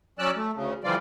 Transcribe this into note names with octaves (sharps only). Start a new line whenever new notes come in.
F#3 C#4 D5 E6 F#6
A3
D2 C#3
D3 E3 F3 G3 F4 D5